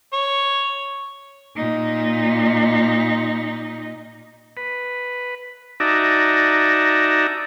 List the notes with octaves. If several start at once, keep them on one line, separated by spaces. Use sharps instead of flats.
C#5
A#2 D#4
B4
D#4 F#4 D5 E5 A5 A#5